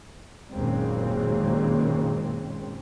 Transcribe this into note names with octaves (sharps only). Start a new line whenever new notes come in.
F#1 D#2 A#2 C#3 G#3 C4